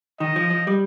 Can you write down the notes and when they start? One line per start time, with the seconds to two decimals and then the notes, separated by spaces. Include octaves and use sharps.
0.20 D#3 D#5
0.36 F3
0.50 F3
0.67 G3